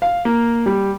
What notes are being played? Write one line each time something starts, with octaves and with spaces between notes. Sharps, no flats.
F5
A#3
G3